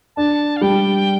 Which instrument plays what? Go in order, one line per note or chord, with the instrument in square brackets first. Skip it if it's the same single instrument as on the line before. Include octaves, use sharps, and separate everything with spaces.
[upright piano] D4 [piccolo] A5
[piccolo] F5
[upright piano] G3 [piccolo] G5